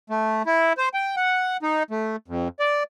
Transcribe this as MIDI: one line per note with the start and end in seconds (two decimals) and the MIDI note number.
0.10 0.42 57
0.46 0.73 64
0.78 0.89 72
0.94 1.16 79
1.16 1.57 78
1.63 1.83 63
1.91 2.16 57
2.28 2.48 41
2.60 2.83 74